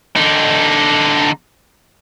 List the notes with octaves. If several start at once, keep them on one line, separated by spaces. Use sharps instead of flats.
D3 D#4